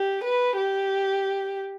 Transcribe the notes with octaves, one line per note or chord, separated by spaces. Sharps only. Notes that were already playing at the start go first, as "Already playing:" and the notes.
Already playing: G4
B4
G4